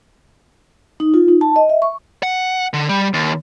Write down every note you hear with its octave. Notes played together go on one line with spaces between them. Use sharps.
D#4
F4
D#4
A5
D#5
E5
C#6
F#5
D3
G3
D#2